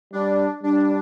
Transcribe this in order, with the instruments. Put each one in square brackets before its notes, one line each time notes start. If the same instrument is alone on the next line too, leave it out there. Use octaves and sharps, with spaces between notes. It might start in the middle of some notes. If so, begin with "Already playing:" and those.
[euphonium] G3 [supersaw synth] D4
[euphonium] G3 [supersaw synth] D4